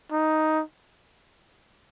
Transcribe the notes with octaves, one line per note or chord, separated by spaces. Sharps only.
D#4